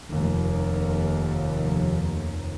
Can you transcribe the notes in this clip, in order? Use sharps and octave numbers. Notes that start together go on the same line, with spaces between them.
F1 D#2